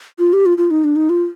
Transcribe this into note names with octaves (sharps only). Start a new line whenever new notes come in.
F4
G4
F4
F4
D#4
D4
D#4
F4